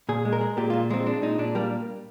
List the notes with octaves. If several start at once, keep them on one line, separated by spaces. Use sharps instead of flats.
A#2 G#4
G#3
A#4
G#3
A#2 G4
A#2 F4
G#3 C4
G#3 D4
A#2 D#4
A#2 D4
G3 A#3